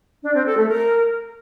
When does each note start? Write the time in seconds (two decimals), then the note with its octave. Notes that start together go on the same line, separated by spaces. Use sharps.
0.23 D4
0.35 C4
0.46 A4
0.57 A3
0.69 A#4